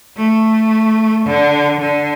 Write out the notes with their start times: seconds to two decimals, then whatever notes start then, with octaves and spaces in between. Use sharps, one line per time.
0.17 A3
1.26 D3
1.81 D3